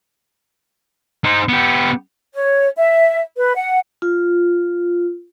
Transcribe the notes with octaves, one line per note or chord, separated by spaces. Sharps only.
D#4 C5
B3 G4
C#5
E5
B4
F#5
F4